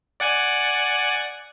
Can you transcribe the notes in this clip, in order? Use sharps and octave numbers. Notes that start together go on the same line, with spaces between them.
D5 F#5 G#5